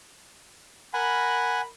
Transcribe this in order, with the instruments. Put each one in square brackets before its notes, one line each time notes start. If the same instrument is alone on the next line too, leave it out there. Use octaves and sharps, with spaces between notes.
[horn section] A#4 B5 [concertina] F#5 G#5